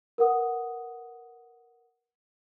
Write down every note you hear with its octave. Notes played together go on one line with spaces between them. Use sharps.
A#4 B4 F#5 D#6